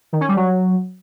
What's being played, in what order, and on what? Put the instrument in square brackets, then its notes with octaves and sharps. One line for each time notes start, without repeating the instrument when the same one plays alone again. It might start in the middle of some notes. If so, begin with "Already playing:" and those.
[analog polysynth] D#3
C#4
G3
F#3